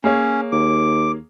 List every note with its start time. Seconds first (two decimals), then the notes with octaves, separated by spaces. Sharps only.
0.04 A#3 C#4 G#4 C#5
0.52 D#2 D6